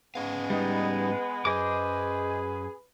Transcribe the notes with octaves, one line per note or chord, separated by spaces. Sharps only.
G#2 G#3 B3 C#4 F5
G3 D#4 B4
F#2 G#4 C5 D#5 D6